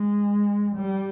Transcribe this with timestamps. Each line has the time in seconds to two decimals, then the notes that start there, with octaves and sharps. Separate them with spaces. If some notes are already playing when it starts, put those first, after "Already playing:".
Already playing: G#3
0.76 G3